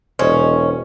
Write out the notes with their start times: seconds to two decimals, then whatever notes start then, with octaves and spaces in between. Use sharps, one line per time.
0.19 E1 C#4 C5 D#5 G#5